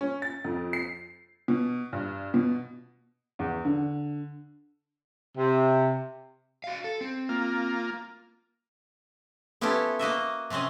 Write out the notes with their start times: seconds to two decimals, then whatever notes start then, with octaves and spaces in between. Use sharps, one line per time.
0.01 C#4
0.22 A6
0.44 F2
0.73 C7
1.48 B2
1.93 G2
2.34 B2
3.39 E2
3.65 D3
5.37 C3
6.64 F#4 F5
6.84 A4
7.01 C4
7.29 A#3 F4
9.61 B3 C#4 E4 F4 G4 A4
9.99 A#3 F#4 D#5 E5
10.50 C3 F#3 C4 C#4 D#5